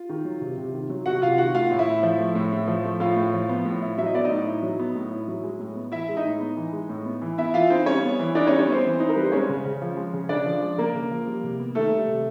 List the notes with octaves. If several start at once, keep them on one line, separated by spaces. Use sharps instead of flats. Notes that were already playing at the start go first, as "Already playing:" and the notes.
Already playing: F4
D#3
F#3
C3
C3
D#3
F#3
C3 F#4 F#5
C3 F4 F5
D#3 F#4 F#5
A3 F4 F5
A2
E4 E5
A2
F3
A3
A2
A2
F3
A3
A2 F4 F5
A2
F3
B3
A2
E4
F#3 E5
D#5
B3 D5
D#4 D#5
A2
E4
F#3
B3
A2
E4
F#3
G#3
A2
B3
E3 E4 E5
G#3
D#4 D#5
A2
B3
E3
G#3
A2
B3
E3
B3 E4 E5
E3 F4 F5
C4 D#4 C5
G3 C#4 C#5
B3
E3
D4 D#4 D5
C#4 C#5
G3
C#4 C#5
B3
C4 C5
E3
D#4
A#4
G3 B4
C5
G#3 C#4 C#5
C#3
C#3
F3
G#3
C#3
C#3 D4 D5
F3
G#3
C#3 A#3 A#4
C#3
F3
G3
C3
B3
D#3 A3 A4
G3
C3